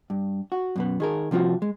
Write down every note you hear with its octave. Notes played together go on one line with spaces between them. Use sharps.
G2
F#4
F#2 B2 B3
D#3 G#4 A#4
C3 F3 C4 F4 F#4
G#3